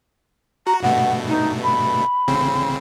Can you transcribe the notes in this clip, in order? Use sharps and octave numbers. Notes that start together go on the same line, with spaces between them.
F#4 A#5
G2 B2 A3 F#5
D#4
B5
A1 C#3 C4